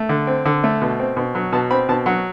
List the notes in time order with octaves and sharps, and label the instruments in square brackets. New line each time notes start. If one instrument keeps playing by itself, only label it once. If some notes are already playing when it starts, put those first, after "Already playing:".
Already playing: [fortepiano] A3
D3
C4
D3
A3
B2
C4
B2
F#3
B2 A5
C4 B5
B2 A5
F#3 F#5